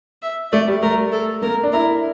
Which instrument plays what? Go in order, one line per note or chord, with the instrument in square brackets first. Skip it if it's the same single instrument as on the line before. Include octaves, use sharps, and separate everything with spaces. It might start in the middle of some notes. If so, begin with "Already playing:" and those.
[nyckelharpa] E5
[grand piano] A3 [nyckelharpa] D5
[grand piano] G3
[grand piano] A3 [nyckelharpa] A#4
[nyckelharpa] A4
[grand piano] A#3 [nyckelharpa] A#4
[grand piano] D4
[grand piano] E4 [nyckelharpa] A#4